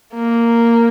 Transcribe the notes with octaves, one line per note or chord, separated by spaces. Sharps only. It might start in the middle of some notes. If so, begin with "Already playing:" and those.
A#3